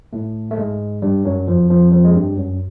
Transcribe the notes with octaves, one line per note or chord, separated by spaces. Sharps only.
A2 A3
A3
G#2 G#3
G2 G3
F#2 F#3
F2 F3
F2 F3
F2 F3
G#3
G2 G3
F#2 F#3